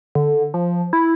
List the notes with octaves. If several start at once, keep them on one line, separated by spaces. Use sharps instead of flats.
D3
F3
E4